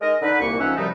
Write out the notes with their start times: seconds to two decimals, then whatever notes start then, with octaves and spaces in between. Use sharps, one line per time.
0.02 G#3 D#4 A#4 D#5
0.22 D3 D#4 B4
0.41 C2 A#2 A#3 C#6
0.60 C#2 F3 C#4 D#4 E5 F#5
0.77 F#2 C3 F3 G3 A3 D#4